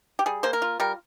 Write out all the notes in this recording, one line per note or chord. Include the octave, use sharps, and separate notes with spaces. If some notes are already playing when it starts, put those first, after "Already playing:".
G4
G3 G#4
A#3 C5
A#4
F4
G3 A#4